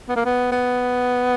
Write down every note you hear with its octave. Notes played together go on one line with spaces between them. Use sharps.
B3
A#3
B3
B3